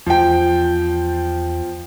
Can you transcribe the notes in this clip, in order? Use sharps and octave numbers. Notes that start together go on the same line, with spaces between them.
E2 F3 G5